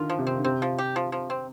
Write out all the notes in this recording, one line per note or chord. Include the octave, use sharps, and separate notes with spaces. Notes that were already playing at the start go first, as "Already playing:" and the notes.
Already playing: D3 D#3 F4
F3
C3
C4
D3
C3 C4
F3
G4
F3
F3
C4